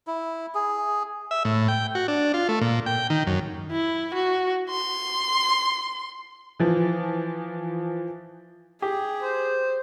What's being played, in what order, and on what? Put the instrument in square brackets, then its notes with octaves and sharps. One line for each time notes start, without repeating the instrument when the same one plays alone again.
[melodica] E4
G#4
[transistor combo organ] E5
A2
G5
F#4
D4
F4
A3
A#2
G5
D#3
F#2
[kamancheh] E4
F#4
C6
[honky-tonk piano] E3 F3
[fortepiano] G4 [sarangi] G#4
[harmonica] C5